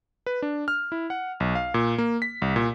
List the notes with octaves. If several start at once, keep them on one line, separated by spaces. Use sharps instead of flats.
B4
D4
F6
E4
F#5
B1
F5
A#2
A#3
B6
C2
A#2